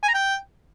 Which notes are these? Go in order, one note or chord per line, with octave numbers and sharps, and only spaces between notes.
G#5
A#5
G5